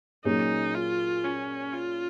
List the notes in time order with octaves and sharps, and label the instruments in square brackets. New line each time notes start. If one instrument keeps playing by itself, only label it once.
[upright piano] A#2 F#3 A#3 C#4 G#4 [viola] D#4
[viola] F4
C#4
F4